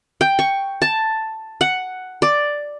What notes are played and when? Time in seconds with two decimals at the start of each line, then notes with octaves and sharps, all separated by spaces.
0.21 G5
0.39 C#6
0.82 A5
1.61 F#5
2.22 D5